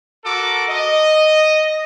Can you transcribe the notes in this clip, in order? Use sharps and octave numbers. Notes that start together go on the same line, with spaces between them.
F#4 A4 A#4 D6
D#5